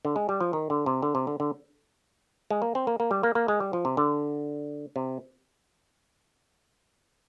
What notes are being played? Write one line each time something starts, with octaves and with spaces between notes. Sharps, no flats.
D3
G#3
G3
F3
D#3
D3
C3
D3
C3
D3
D3
G#3
A#3
C4
A#3
A#3
G3
A#3
A#3
G#3
G3
F3
C3
D3
C3